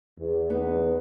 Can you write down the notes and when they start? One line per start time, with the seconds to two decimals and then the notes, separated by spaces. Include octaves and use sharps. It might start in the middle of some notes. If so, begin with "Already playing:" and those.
0.18 E2
0.50 B3 D#4